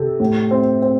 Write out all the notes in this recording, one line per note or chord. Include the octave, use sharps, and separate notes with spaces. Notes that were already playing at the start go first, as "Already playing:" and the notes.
Already playing: C3 A4
A2
C4
C4